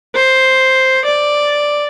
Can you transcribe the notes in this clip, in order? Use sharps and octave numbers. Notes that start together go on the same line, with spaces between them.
C5
D5